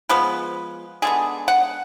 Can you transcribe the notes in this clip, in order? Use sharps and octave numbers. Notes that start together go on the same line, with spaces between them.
F3 G#3 B3 B4
D3 G#3 B3 G#4
F#5